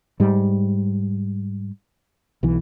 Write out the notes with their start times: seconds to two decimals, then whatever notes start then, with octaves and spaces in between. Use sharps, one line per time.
0.20 G#2 G3
2.43 B1 E3